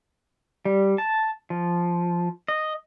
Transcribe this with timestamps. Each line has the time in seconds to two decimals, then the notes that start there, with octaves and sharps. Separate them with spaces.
0.65 G3
0.98 A5
1.50 F3
2.48 D#5